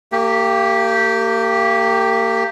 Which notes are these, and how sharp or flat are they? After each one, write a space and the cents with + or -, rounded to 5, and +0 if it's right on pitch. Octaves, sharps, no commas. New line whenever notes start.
A#3 -35 G4 +0